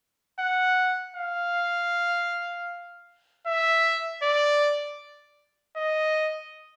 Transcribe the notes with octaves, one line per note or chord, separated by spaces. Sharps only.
F#5
F5
E5
D5
D#5